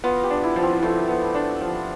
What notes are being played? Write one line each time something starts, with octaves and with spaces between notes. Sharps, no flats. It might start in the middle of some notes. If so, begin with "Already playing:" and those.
B3 F4
G4
D4
E4
F3
C4
F3 A3
B3
D4
F3